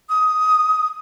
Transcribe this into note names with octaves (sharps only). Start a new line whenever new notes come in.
D#6